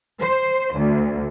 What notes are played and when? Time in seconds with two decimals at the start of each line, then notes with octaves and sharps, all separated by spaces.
0.21 C5
0.76 D2